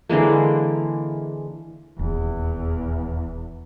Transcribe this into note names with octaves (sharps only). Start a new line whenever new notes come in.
D3 E3 G#3 A#3
D#1 E2